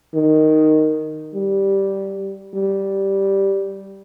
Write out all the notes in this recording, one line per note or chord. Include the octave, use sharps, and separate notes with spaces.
D#3
G3
G3